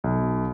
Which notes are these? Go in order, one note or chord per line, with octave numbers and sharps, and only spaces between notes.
B1